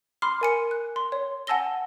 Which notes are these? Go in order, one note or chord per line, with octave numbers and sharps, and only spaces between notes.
B5 C6 D6 F6 C7
A#4 G#5 C#7
F#6
C6
C#5
F#5 G#5 A5 E6 A#6 G7